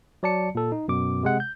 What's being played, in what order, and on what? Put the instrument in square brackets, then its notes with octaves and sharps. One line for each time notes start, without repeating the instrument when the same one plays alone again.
[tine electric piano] F#3 D5 A5 C#7
A#2 A4
D#4
F#2 B2 D6
C3 G#3 F#5
G6